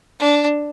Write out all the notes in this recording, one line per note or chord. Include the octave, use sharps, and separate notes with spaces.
D4